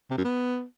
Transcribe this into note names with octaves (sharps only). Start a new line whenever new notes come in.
C3
F#2
B3